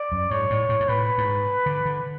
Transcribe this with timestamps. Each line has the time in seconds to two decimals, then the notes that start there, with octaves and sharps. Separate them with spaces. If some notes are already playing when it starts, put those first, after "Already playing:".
Already playing: D5
0.12 F#2
0.31 G#2 C#5
0.50 A2
0.69 A2
0.80 G#2
0.89 A2 B4
1.18 G#2
1.66 D3
1.85 D3